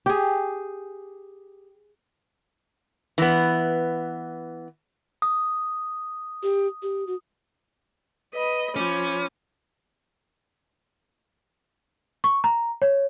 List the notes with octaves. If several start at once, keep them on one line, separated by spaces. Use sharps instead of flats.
G4 G#4
E3 B3
D#6
G4
G4
F#4
B4 D#5 B5
F3 C#4 B5 D6
C#6
A#5
C#5